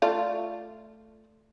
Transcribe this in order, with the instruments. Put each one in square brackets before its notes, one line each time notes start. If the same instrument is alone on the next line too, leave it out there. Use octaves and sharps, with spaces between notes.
[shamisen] A3 F4 D5